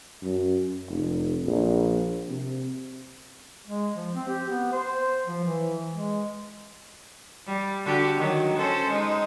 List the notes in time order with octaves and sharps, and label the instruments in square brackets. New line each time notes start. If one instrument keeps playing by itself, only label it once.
[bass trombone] F#2
F1
A#1
C3
[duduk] G#3
F3
C4
G4
B3
C5
F3
E3
G#3
[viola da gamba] G3
D3 F#4 G4
D#3 F#3
C#4 A4 C5
G#3 D#4